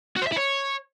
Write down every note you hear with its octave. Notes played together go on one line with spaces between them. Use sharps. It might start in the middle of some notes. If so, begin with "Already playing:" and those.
F#4
C5
E5
E4
C#5